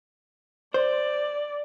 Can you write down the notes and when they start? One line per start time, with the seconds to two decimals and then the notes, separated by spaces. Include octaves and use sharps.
0.74 C5 D5